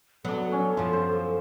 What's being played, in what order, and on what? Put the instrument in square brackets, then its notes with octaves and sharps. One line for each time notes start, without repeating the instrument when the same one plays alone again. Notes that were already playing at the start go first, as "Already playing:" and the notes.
[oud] F#3 [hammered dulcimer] B3 D4 [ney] A4
[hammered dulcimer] C#4
[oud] F#2 F3 [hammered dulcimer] F4
[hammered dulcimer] C5